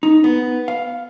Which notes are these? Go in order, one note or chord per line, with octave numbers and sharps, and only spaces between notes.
D#4
B3
F5